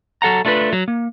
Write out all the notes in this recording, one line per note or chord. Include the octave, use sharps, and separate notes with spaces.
F#3 A4 F#5 A#5
A3 D4 F4 A4 B4
F#3
A#3